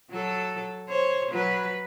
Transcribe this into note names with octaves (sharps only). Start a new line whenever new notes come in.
F#3 A4
C5 C#5
F#3 B4